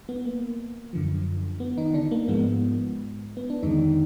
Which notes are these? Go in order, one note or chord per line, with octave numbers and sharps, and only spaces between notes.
B3
A#3
F#2 D3 F3
B3
D#3 D#4
D3 D4
A#3
G#2 F3 G#3 B3
B3
D4
F2 D3 D#3 G#3 D#4